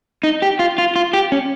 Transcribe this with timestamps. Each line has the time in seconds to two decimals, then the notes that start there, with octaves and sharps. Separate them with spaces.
0.23 D#4
0.42 G4
0.59 F4
0.78 F4
0.96 F4
1.13 G4
1.32 C#4